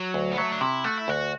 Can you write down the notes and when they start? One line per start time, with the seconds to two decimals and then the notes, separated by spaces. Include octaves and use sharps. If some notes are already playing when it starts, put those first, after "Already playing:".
Already playing: F#3
0.14 D2
0.31 B3
0.37 F#3 A3
0.52 D4
0.61 C3 E4
0.84 A3 F#4
0.97 E4
1.08 D2 F#4